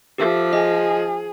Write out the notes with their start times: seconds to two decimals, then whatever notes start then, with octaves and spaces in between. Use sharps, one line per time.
0.18 F3 G4 A4 E5
0.53 G#4 D#5